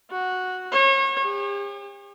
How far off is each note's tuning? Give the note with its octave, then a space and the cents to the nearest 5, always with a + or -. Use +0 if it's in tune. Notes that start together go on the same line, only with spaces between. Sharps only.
F#4 -5
C#5 -35
G4 +45